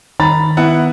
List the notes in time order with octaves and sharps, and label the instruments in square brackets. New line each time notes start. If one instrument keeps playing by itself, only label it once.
[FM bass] D#3 [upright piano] A#5 B5 A6
[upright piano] B3 E4 F#5